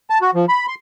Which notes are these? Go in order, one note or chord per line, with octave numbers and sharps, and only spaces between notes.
A5
F#4
F3
B5
C6